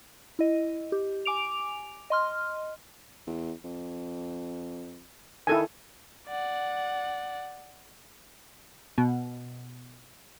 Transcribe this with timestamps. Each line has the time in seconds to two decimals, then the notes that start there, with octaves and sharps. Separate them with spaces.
0.39 E4 D#5
0.92 G4
1.25 G#5 D6 D7 F7
2.10 D#5 C6 F6
3.27 E2
3.64 F2
5.47 D#3 E4 A4 G#5
6.28 D5 F#5
8.98 B2